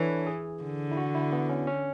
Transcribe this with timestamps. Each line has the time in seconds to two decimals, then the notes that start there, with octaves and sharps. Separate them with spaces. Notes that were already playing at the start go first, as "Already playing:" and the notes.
Already playing: E3 D4 A4 B4 C#5
0.27 G#4
0.63 D3
0.91 E4
0.97 F#4
1.15 E4
1.32 B3
1.49 C#4
1.67 C#4